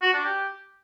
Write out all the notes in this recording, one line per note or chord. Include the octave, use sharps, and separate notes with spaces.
F#4
D4
G4